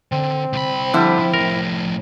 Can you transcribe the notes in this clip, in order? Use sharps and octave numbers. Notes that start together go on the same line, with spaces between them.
D3 C4
C2 B5
D3 F3 G3 E4
A2 F3 A#4